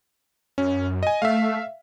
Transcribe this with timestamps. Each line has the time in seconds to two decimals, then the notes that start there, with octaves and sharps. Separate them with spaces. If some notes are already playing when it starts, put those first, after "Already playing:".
0.58 F#2 C#4
1.03 D#5 G#5
1.22 A3 E5 F5